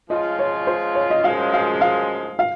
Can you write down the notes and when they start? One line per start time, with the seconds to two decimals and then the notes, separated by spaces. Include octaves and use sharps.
0.10 F3 G#3 C#4 F4 D#5
0.39 C#5
0.67 C5
0.95 C#5
1.10 D#5
1.24 F#2 F3 G#3 F5
1.54 F5
1.81 F5
2.39 F5